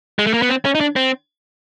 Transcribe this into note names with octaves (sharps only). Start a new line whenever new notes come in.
G#3
A3
A#3
B3
C4
C#4
D#4
D4
C4